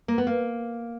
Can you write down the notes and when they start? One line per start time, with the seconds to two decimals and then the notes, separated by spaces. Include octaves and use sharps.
0.08 A#3
0.18 B3
0.27 A#3